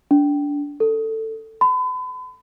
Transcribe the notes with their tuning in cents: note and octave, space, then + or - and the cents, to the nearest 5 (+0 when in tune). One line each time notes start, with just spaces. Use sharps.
D4 -25
A4 +15
B5 +40